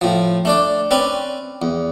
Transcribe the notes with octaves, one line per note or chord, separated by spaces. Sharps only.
A2 F3
A3 D4 D5
C4 C#4 B4 D5
E2